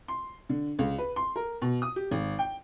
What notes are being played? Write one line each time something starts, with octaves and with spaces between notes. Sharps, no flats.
C6
D3
C#2
B4
C6
A#4
B2
D#6
G4
G#1
G5